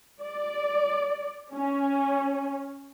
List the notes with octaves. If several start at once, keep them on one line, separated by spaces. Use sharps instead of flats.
D5
C#4